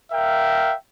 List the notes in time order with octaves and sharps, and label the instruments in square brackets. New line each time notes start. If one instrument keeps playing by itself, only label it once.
[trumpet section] A#4 E5 F5 G5